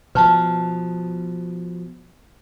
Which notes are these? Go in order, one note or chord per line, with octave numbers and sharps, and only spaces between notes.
B2 F3 B4 A5